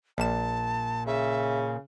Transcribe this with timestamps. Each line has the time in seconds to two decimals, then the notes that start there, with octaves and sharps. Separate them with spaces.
0.18 A#1 A#2 A5 E7
1.07 C#3 E5